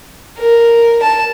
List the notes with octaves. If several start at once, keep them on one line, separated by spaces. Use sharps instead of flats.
A#4
A5